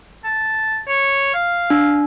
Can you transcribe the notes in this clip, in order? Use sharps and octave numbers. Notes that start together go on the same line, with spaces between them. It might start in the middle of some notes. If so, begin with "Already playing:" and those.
A5
C#5
F5
D4